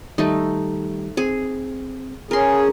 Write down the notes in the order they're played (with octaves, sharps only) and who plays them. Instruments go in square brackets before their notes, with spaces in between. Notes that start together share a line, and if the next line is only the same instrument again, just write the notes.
[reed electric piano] D#3 G3 G4 [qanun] A3 D#4
[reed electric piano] C4 [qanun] G#4
[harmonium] C#4 G#4 [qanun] A#4 C6